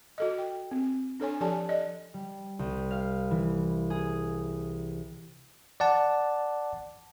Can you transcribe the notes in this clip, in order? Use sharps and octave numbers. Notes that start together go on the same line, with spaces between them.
F#4 A4 D#5
G5
C4
D4 A4 C#5 G#5
F3 G4 A4 D5 G#5 A5
D5 D#5
G3
C2
F5
E3
G#4
D5 F#5 A5